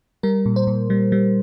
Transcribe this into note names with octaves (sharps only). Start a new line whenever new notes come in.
G3 A#4
A#2
C5
A#2
G3
G3